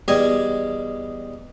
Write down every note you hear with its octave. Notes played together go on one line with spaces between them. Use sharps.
E2 G3 D#5 G#5